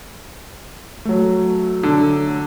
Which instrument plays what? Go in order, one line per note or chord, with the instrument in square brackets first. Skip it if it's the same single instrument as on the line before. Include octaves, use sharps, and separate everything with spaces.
[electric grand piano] F#3 A3
[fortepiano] D3